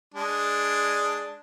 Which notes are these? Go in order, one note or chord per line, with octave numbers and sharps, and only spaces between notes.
G#3 D4